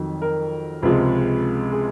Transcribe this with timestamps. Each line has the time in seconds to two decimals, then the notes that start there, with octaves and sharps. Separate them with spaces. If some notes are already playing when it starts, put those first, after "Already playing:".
Already playing: F2 D#3 F#3
0.22 A#4
0.82 C#2 C3 F3 G#3
1.72 G#4